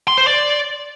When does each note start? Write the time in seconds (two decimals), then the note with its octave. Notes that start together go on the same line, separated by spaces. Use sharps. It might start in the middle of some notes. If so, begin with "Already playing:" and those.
0.08 C6
0.18 C5
0.27 D5